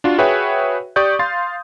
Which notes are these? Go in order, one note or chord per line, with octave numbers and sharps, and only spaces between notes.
D4 F4 F#4
F#4 G#4 B4 C#5 E5 G5
G4 D5 C#6 D#6 G6
F5 C6 A6